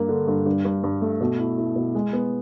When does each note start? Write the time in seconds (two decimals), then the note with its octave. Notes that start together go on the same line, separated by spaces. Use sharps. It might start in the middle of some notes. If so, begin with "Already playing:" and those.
Already playing: G2 A#3
0.09 D3
0.28 G2
0.46 G2
0.65 G2
0.84 G2
1.01 A3
1.21 B2
1.39 E4
1.58 E4
1.76 B2
1.95 G#3
2.13 B3